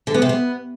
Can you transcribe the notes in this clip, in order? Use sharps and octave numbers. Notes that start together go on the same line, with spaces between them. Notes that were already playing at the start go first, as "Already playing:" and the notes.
D3
B3
C3
B3